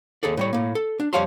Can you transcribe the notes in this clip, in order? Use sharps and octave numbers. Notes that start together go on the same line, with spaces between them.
D#2 G#4 A4 D5
A2 G3 C#5
A2 A#3
A4
D4
F2 G3 C#5 F5 A5 C6